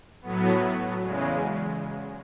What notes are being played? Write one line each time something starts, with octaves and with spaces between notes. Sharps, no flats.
A2 F#3 B3
E2 C#3 G#3